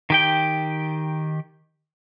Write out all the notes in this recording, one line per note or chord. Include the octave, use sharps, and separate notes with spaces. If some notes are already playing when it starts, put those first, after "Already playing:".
D#3 G4 G5